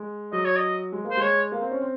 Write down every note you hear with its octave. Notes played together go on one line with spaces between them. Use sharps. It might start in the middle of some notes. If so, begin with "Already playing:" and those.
Already playing: G#3
F#3 D#5
C#5
D#5
G#3
A#3
C5
G#3 C#5
A#3
C4
C#4
C4